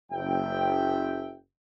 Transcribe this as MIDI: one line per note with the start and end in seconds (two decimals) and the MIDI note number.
0.12 1.34 30
0.12 1.34 76
0.12 1.34 79